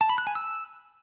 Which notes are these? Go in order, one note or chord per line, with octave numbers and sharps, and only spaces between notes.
A5
B5
F#6
G#5
E6